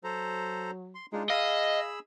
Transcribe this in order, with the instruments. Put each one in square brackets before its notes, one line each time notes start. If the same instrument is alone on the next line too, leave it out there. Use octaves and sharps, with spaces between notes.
[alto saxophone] F#3 [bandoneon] A4 C5 A#5
[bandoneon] C6
[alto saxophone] G#3 [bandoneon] D4 D#4 F4
[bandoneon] G#4 B5 E6 [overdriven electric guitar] D#5 [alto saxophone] F5